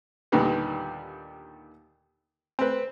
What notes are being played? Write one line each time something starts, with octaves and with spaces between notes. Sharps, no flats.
D#2 A#2 D3 D#3 G3 B3
C4 B4